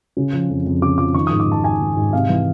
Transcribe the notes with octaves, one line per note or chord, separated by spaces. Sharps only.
C#3
F3
F2
F2
C#3 D6
F3 D6
D#3 C#6
D#6
G#2
D6
D#3 A5
G#2 G#5
D#3
G#2
C3 F5
E3